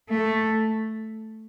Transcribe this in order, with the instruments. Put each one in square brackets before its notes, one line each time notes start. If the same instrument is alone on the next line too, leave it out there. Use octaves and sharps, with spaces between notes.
[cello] A3